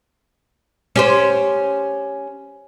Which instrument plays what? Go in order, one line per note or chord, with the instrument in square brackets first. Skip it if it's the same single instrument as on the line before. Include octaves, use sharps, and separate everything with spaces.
[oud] C#4 G4 C5